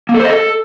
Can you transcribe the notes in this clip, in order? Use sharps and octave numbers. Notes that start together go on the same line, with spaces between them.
A#3
A4
C5
D#5
A4